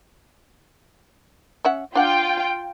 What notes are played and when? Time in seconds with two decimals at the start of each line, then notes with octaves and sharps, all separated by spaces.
1.65 C#4 E5 F#5
1.95 D4 F4 F#5 G5